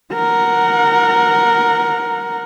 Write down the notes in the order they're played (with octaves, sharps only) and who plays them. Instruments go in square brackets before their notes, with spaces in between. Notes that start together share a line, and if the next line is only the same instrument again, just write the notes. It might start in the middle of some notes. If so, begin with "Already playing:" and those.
[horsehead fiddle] A#4 F#5